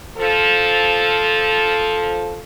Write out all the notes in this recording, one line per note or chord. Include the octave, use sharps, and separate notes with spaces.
F3 A4